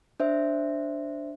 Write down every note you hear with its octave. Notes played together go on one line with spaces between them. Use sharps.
D4 C5 E5